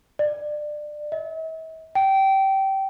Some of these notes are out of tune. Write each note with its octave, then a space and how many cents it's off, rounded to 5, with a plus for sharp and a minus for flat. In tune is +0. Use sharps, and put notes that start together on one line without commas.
D5 +25
E5 -45
G5 -20